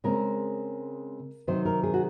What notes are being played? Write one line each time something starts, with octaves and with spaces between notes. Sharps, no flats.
C#3 G#3 C4 A#4
C3 D#3 F#3 C4 C5
A#4
G#4
F#4